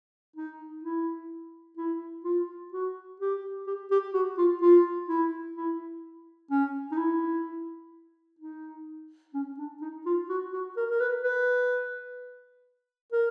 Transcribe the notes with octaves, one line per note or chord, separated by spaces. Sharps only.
D#4
E4
E4
F4
F#4
G4
G4
G4
F#4
F4
F4
E4
E4
C#4
D#4
E4
D#4
C#4
D4
D#4
F4
F#4
F#4
A#4
A#4
B4
B4
A#4